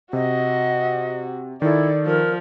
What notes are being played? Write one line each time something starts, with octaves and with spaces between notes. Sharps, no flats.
C3 F#4 D#5
D#3 E4 A4 D5
F3 A#4